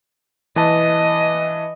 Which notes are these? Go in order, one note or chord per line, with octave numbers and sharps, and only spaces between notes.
E3 B4 D#5 A5